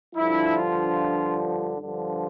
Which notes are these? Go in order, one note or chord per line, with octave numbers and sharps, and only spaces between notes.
G2 D3 F3 E4
F4
G2 D3 F3